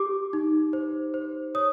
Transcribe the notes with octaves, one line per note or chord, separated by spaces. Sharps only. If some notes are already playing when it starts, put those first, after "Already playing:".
Already playing: G4 D6
D#4
C5
C5
C#5 D#6